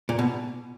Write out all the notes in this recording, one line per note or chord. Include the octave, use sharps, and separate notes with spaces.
A#2
B2